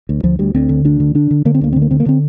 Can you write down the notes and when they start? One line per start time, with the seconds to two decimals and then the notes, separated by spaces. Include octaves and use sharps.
0.09 D2
0.23 D2 F3
0.39 D2 G3
0.54 D2 C4
0.69 D3
0.85 D2 D4
1.00 D3
1.15 D3 D4
1.31 D3
1.45 D3 A#3
1.54 C4
1.61 D2 A#3
1.72 D3 C4
1.82 A#3
1.91 D3 C4
2.00 A#3
2.06 D3 C4